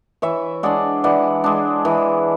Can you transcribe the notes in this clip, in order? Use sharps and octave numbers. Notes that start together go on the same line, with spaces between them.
E3 C#5 E5
G#3 D4 D5 F#5
E3 D5 F#5
G#3 D4
E3